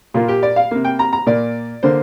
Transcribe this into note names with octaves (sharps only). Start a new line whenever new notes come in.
A#2 A#3 F4
G4
D5
F5
C3 A#3
G5
A#5
A#5
A#2 A#3 D5
D3 A#3 C5